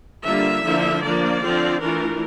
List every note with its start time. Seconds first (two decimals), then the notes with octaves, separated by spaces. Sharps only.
0.24 D3 G3 A#3 F4 E5
0.63 D3 F3 A#3 E4
1.01 F3 A#3 D4 D5
1.40 D3 F3 C4 F4
1.80 E3 A3 D4 F4 A#4